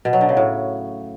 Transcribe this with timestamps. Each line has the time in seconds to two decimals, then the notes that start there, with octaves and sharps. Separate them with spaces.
0.05 B2
0.13 F#3
0.21 D3
0.29 C#3
0.37 A2